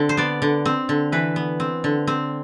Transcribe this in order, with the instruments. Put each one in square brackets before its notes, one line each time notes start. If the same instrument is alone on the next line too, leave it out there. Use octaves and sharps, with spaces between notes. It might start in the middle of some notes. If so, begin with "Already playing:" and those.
Already playing: [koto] D3 C4
C5
B3 D5
D3
C4
D3
E3 B4
B3
C4
D3
C4